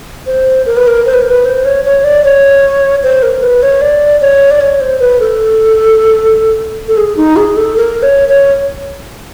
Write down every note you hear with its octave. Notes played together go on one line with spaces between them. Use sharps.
C5
A#4
B4
A#4
C5
B4
A#4
B4
C5
C#5
C#5
D5
C#5
C5
A#4
B4
C#5
D5
C#5
D5
C#5
C5
B4
A4
A4
G#4
D#4
G#4
A4
A#4
C#5
C#5